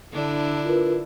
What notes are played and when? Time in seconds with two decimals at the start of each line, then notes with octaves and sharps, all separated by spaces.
0.12 D3 D4 E4
0.65 F4 A#4 B4